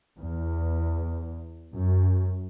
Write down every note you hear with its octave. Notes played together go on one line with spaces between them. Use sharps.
E2
F#2